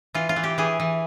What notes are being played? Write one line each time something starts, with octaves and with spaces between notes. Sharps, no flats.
E3 F4
F4
E3
G4
E3 G#4
E3